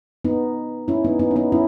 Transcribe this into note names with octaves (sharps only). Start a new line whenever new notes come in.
B3 D#4
C#4 E4
B3 D#4
B3 D#4
C#4
B3 D#4
C#4 E4